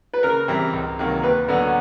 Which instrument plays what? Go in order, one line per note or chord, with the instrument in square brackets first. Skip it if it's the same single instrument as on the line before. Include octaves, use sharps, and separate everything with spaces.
[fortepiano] B4
[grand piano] C#3 [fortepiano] A#4
[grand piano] E3 G3 C4
C#2
C3 D#3 F#3 A#3
[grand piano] D#2 [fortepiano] B4
[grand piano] D3 F#3 B3 D4